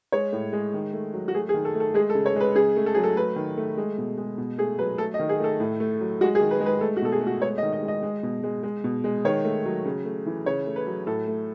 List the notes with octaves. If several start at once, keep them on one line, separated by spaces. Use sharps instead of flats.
G#3 C#5
A2
G#3
D#3
A3
F#3
F#4
A3 G#4
G#4
D#3
A4
A3
A4
G#3 G#4
A4
C#3
C#5
G#3 B4
C#3 G#4
A3
A4
F#3 G#4
A4
A3 B4
D#3
A3
G#3
B2
G#3
B2
A3 G#4
F#3 B4
A3 A4
D#5
D#3
G#4
A3 A4
A2
A3
F#3
G#3 F#4
G#4
D#3
B4
G#3
B4
A3 A4
F#4
B2 A4
G#4
A3
F#4
G#3 C#5
D#5
D#3
D#5
G#3
D#5
G#3
B2
G#3
G#3
B2
G#3
D#3 C#5
A3
F#3
C#3
A3
E3
C#3 C#5
A3
B4
F#3
A2 A4
A3